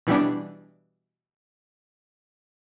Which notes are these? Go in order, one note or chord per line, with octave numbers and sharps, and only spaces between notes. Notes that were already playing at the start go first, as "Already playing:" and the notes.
B2 E3 G3 B3 D4